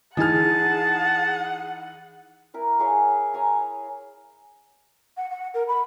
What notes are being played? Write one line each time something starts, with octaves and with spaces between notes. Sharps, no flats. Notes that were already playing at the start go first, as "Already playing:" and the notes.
E3 D#4 G#4 F#5 A5 F6
E4 A#4 B4
E4 G#4 C#5 F5
C#5 G#5 A#5
F#5
F#5
A#4
B5